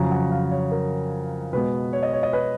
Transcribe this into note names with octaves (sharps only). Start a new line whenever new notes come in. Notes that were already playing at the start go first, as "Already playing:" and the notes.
Already playing: F2 C#3 F#3 A#5
F#5
F5
C#5
A#4
B2 G#3 B3 B4
C#5
D#5
C#5
D#5
B4